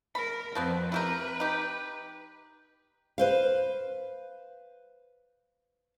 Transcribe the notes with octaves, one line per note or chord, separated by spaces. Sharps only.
A#4 B5
F2 F3 B3 C4
E4 G4 A#4 B4
D#4 G4
B4 C5 F5